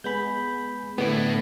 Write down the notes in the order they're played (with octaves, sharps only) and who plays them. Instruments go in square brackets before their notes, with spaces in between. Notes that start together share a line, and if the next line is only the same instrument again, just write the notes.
[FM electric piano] G#3 B3 G#4 [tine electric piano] B5 G6
[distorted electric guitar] A2 [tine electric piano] D3 [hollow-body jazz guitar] B3 D5